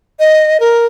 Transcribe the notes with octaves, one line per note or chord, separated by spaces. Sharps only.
D#5
A#4